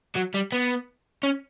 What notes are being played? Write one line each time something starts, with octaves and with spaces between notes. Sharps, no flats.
F#3
G3
B3
C#4